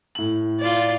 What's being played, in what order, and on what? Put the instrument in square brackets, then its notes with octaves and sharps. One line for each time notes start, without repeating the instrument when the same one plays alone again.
[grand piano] A2 F#7
[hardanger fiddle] F4 D5